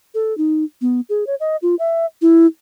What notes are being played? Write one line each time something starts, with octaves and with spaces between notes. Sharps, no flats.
A4
D#4
B3
G#4
C#5
D#5
F4
E5
E4